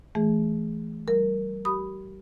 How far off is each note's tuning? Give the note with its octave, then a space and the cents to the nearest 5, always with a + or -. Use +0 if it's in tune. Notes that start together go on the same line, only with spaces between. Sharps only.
E3 +0 A3 -25 G#4 +0
G3 -40 A#4 +0
G4 -35 B5 +0 D#6 +0